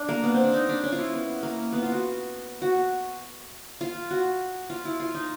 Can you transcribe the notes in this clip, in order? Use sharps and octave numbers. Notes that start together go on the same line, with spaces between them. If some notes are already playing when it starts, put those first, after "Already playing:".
Already playing: D4
A#3
B3
C4
D4
D#4
D4
C#4
F4
E4
B3
A#3
B3
F4
F#4
F#4
F4
F#4
F4
E4
F4
D#4